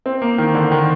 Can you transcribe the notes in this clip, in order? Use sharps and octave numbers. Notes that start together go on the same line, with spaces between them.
C4
A#3
D#3
D3
D#3